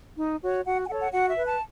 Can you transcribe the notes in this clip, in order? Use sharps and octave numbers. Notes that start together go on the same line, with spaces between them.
D#4
F#4 C#5
F#4 F#5
G#5
A4 C#5 F#5
F#5
F#4 F#5
E5
B4
A5